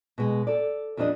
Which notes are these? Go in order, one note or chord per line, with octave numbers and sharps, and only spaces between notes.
B2 G#3
A4 D5
F2 F3 G3 D4 D#5